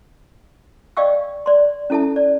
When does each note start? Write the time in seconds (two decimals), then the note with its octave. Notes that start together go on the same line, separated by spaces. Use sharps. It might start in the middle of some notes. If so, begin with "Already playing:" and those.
0.97 D5 D#5 F5 G5 C#6 E6
1.46 D5 C6
1.90 C#4 E4 A4 E5 A5
2.16 D5